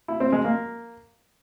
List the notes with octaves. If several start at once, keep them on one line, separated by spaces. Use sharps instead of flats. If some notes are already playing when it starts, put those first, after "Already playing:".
E4
C4
G#3
A#3